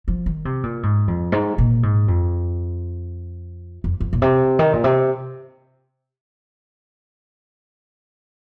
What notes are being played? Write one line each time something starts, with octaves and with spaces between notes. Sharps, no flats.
F3
D#3
C3
A#2
G#2
F2
G#2
A#2
G#2
F2
F2
F2
A#2
C3
D#3
A#2
C3